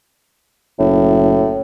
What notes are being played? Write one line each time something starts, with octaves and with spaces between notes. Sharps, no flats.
F#1 A2